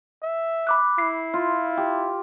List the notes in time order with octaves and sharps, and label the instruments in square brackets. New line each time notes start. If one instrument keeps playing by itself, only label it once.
[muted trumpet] E5
[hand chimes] B5 D6 F#6
[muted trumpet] E4 [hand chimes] C7
[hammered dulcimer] F4
G4